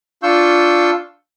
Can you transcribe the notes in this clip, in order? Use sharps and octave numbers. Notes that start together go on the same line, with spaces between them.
D4 F4 F5 C#6 E6 G6